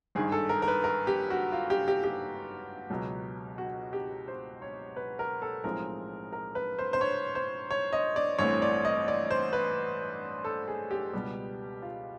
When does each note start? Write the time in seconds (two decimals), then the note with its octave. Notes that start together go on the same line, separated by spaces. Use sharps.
0.15 G#1 G2 D#3 G#4
0.32 A4
0.49 A#4
0.62 A#4
0.68 B4
0.84 A#4
1.07 G4
1.30 F#4
1.52 F4
1.70 G4
1.88 G4
2.04 G4
2.90 C#2 B2 F#3 B3
3.58 F#4
3.93 G4
4.28 C5
4.62 C#5
4.96 B4
5.19 A#4
5.42 A4
5.64 B1 A2 F3 G#3 C4 A#4
6.33 A#4
6.55 B4
6.79 C5
6.93 C5
7.01 C#5
7.35 C5
7.71 C#5
7.93 D#5
8.16 D5
8.38 A1 G2 E3 A3 C4 C#5
8.62 D5
8.85 D#5
9.08 D5
9.31 C5
9.53 B4
10.44 A4
10.68 G#4
10.91 G4
11.13 C#2 B2 G3 B3
11.82 F4